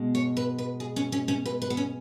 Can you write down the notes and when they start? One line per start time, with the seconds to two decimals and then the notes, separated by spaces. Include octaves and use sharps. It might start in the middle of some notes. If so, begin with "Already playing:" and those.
Already playing: B2 G#3
0.15 C#5
0.37 B4
0.58 B4
0.80 G#4
0.96 C#4
1.12 C#4
1.28 C#4
1.46 B4
1.62 B4
1.70 B3
1.77 C#4